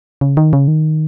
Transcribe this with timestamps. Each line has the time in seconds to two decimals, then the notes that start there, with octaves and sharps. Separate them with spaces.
0.21 C#3
0.37 D#3
0.53 C#3
0.68 D#3